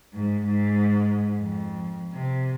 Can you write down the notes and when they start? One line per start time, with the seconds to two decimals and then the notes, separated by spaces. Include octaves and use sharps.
0.14 G#2
0.47 G#2
1.38 F2
2.14 C3